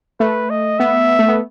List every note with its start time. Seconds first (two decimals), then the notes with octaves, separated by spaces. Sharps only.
0.20 A3 B4
0.50 D#5
0.79 B3 E5
1.19 A3
1.28 B3